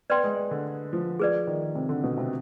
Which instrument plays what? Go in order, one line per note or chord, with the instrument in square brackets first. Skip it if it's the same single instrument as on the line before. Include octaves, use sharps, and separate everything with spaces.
[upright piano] B3 [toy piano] B4 D5 G5 C6
[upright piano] G#3
D3
F3
[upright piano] F3 [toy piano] G#4 B4 D5
[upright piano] D#3
C3
D3
B2
C3